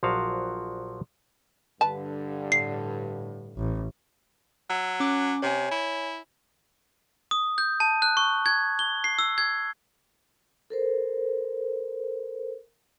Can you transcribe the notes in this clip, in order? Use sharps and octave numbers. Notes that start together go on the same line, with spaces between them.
A#1 F3 F#3 F#4 F5
G2 D3 B4 A5
A2 C7
A1
F#3 E6
C#4 D6 F#6
C3 C#5 G#5
E4
D#6
G6
A5
F#6
C#6
G#6
G7
C7
E6
G#6
A4 A#4 C5